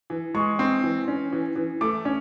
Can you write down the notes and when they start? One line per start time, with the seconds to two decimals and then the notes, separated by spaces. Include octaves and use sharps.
0.10 E3
0.35 G#3 C#6
0.59 C4
0.83 E3
1.08 C#4
1.32 E3
1.56 E3
1.81 A3 D6
2.05 C#4